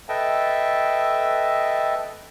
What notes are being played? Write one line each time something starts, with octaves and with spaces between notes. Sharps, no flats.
A4 B4 D#5 E5 G5 A5